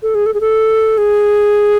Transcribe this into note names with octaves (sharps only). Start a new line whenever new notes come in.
A4
G#4
A4
G#4
A4
G#4